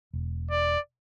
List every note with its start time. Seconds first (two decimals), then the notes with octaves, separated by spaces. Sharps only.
0.13 E1
0.51 D5